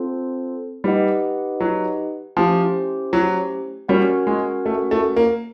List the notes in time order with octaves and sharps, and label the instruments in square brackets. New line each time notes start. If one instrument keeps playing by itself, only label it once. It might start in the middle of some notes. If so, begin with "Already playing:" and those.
Already playing: [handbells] C4 F4 A4 C5
[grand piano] G3 [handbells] D#4 G4 B4 D#5 F#5
[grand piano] F#3
[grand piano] F3 [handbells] A3 C#4 E4 G4 C5
[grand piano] F#3
[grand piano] G3 [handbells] C#4 F#4 A#4 C#5 F#5
[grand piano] G#3
A3
A3
A#3